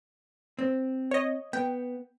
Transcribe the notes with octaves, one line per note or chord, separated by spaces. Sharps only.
C4
C#5 D#5
B3 G5